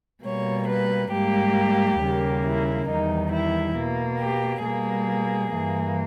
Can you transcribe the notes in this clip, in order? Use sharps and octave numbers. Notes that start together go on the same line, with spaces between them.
B2 G3 A#3 C#5
B4
G#2 G3 A#3 G4
D#2 C#3 G3 A#3
E4
E2 D#3 G3 D#4
E4
B2 A#3
G4
B2 G3 A#3 G#4
G2 E3 A#3